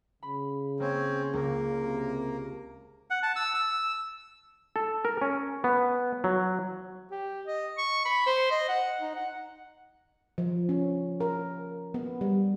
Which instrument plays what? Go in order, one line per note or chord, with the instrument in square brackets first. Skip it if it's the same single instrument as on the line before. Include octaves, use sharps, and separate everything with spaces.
[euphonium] C#3 [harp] B5
[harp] A#3 [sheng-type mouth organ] C4 C#4
[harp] C#2 [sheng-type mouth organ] A#3
[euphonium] C3
[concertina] F#5
A5
E6
E6
[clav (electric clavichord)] A4
A#4
C#4
B3
F#3
[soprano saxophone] G4
D#5
C#6
B5
C5
D#5
F#5
D#4
F#5
[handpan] F3
C#4
A#4
B3
G3